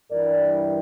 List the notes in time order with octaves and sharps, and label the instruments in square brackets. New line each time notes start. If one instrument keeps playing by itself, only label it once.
[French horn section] G2 E3 G3 A#4 D5